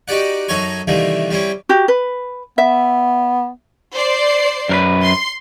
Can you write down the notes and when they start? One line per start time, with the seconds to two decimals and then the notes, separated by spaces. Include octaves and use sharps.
0.08 D#4 F#4 G4 D5 F#5
0.48 F#2 F#3 D#4 A4 C#5 C6
0.87 C3 D#3 E3 G3 A3 A#3
1.30 G3 C4 C#4 E4
1.69 F#4 G4
1.88 B4
2.58 B3 E5
3.94 C5 D5 C7
4.69 F#2 A#4 B4
5.03 C6 C7